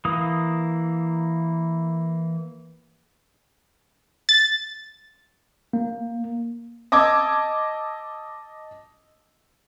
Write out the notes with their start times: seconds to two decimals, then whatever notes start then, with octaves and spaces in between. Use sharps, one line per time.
0.05 E3 A#3 D#6
4.29 A6
5.73 A#3
6.92 D#5 A5 D6 E6 G#6